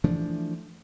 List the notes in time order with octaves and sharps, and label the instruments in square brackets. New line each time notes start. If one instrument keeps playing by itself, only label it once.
[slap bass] E3 F3 A3 D4